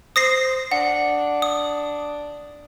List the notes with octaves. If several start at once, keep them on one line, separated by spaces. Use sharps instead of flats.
C5 D#6 A#6 C7
D4 F#5
D#6